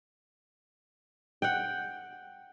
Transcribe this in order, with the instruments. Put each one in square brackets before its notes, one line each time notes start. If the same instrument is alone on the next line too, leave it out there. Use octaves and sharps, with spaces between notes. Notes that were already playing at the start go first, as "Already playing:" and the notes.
[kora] F#5 G5